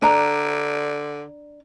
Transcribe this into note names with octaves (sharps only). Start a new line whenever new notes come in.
D3 D4 A#5